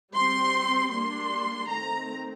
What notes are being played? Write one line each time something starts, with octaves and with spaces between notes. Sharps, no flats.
G3 C4 C6
G3 A#3 D4 C6
D#3 A3 C4 A#5